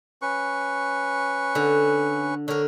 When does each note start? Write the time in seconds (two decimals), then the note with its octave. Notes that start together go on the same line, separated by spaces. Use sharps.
0.22 C#4 B4 C#6
1.55 D3
2.48 D3 A#4 C#5